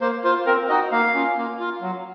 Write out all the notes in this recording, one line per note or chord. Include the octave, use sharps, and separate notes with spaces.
A#3 C5
F4 C5
C4 A#4
D#4 F#4 D#5
A#3 F5
C#4 F4
A#3
F4
F#3